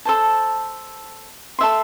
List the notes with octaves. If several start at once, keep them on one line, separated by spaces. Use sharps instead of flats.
A4 C5 A5
A4 E5 C6